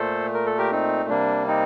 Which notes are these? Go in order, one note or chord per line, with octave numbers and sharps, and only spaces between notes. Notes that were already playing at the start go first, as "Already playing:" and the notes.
Already playing: A#2 A3 A4 C5
A#4
A4
G4 A#4
C4 D#4
C3 G3 A#3 D4
C4 D#4